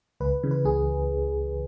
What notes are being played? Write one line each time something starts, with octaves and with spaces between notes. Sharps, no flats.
C#2 B4
C#3 E3
B4
C#2 G#4